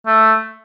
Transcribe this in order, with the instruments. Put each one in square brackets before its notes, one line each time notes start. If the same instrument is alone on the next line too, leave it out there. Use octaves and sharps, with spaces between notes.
[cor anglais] A3